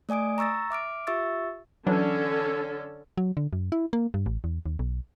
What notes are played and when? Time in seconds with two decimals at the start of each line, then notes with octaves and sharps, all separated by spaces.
0.09 A3 D5 G#5 D#6 D7
0.38 A#5 C#6 E6 A6 A#6
0.70 E5 D6 F6 D7
1.07 F4 G4 E5 C#6 E6 A6
1.87 D3 E3 F#3 C#4 D4 A4
3.17 F#3
3.37 D3
3.53 F#2
3.72 E4
3.93 A#3
4.14 G2
4.26 A1
4.44 E2
4.66 D#2
4.79 B1